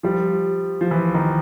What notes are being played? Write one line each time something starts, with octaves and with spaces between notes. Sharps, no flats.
F3 G3
F3
E3
D#3